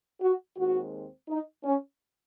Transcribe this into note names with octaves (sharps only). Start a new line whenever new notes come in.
F#4
D#2 D#3 G#3 C4 F#4
D#4
C#4